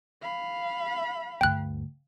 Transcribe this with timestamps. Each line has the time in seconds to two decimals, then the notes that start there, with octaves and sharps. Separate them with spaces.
0.22 F5 B5
1.41 D2 G2 G5 F#6